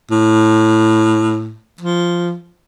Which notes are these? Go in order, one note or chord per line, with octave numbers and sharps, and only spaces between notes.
A2
F3